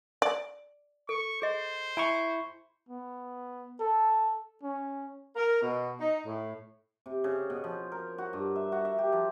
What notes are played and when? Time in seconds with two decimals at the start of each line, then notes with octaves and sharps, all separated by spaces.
0.22 D5
1.09 A4 C#6
1.42 G#4 C5 D#5
1.97 E4 G#5 A#5 B5 C#6
2.89 B3
3.80 A4
4.63 C#4
5.36 A#4
5.62 B2
6.00 D#4
6.26 A2
7.06 C3
7.24 C#3
7.50 B2
7.64 F3
7.92 A#4
8.18 F#4
8.33 G2
8.56 E5
8.72 F#4
8.85 E5
8.98 G4
9.13 F3